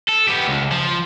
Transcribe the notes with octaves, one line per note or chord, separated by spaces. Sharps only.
A4
B3 G4
C#2
F3